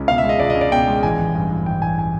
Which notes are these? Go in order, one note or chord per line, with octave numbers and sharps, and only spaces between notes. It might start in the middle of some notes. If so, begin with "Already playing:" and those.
Already playing: C#2 C#4
B2 F5
E5
G#3
D#5
C#2 D5
D#5
C#4
D5
B2 G5
G#3
A1 G#5
A1
G2
E3
A1 G5
A1 G#5
G#5